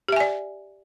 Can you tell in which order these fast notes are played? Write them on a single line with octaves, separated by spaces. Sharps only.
G4 E5 G#5 D5